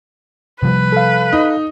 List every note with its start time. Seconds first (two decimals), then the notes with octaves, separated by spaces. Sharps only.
0.63 C3 F3 G3 B4
0.92 A4 F5
1.33 D#4